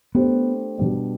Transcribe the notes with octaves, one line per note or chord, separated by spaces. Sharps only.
A3 B3 D4 G4 C5
B2 G3 D4